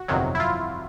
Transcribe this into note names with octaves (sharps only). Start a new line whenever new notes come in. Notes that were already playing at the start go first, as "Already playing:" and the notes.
Already playing: F#4
G1 F2 C3 D#3 F#3
E4
F4